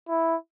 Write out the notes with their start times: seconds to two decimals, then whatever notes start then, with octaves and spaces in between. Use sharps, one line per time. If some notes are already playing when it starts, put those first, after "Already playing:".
0.09 E4